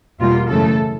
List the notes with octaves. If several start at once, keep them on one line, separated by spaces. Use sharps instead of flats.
E2 B2 G3 A#3 F4
F#2 C#3 E3 A3 A4